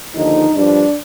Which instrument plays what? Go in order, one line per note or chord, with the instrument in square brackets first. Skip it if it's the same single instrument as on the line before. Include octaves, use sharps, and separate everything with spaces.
[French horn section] D#2 D3 F3 D#4
G2 F3 D4